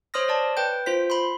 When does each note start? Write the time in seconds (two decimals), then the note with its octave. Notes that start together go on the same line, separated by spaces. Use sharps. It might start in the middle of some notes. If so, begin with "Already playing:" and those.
0.14 C5 C#5 C6 D#6 F6 A#6
0.28 C#5 D5 A5
0.57 B4 G5 G6
0.86 F4 C5 B6
1.10 B5 C6